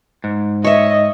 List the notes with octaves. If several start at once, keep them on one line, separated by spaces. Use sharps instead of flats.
G#2
C#5 D#5 E5